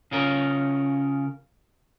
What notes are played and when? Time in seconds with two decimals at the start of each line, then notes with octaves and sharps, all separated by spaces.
0.11 C#3 C#4 F4 A#4